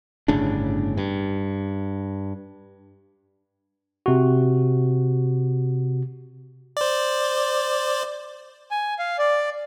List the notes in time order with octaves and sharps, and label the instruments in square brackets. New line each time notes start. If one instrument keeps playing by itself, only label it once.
[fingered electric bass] G1 A2 C#3 D4
G2
[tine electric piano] C3 F#4
[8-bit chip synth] C5 D5
[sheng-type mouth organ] G#5
F5
D5